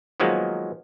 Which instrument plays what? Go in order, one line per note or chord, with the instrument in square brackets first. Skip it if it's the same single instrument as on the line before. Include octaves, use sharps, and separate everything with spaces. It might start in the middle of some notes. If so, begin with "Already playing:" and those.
[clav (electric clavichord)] D#3 F3 F#3 G#3 A#3 B3